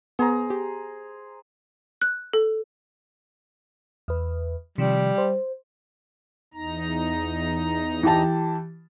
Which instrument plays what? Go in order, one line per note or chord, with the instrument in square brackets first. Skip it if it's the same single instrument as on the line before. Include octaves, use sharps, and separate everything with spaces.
[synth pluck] B3 [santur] G#4 C5 A#5
[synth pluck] G4
[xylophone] F#6
A4
[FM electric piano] E2 B4
[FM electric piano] C3 D#3 F3 [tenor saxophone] G3
[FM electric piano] C5
[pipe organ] E2 D#4 A#5
[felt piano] E3 G4 A5